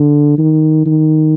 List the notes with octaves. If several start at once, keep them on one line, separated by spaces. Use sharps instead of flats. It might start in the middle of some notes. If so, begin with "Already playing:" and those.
Already playing: D3
D#3
D#3